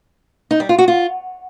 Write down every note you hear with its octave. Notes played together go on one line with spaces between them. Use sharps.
D#4
G3
F4
F#4
F4